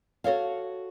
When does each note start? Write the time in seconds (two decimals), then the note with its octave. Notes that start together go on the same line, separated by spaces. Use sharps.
0.24 F#4 A4 C#5 F5